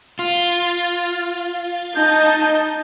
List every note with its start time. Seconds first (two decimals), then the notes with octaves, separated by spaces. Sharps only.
0.19 F4
1.95 D#4 D#5 A5 G6